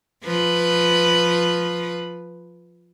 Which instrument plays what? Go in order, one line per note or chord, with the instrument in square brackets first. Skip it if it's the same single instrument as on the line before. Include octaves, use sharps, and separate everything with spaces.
[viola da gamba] F3 B4